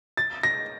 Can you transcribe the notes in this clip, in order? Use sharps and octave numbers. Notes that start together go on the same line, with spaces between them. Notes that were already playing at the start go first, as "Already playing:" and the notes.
A6
A#6